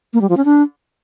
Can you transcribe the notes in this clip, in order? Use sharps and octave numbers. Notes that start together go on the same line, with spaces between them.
A#3
G3
F3
C#4
D4